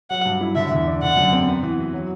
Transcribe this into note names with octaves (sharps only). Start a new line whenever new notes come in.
F#3 F#5
G2
E4
D3 E5
E2
D4
D3 F#5
F#2
C4
B3
E3
F#4
F#3